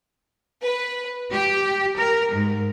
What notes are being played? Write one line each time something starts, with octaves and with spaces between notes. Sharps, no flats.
B4
G4
A#4
G#2